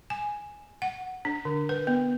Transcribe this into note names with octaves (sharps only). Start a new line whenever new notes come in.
G#5
F#5
D4
D3
B4
B3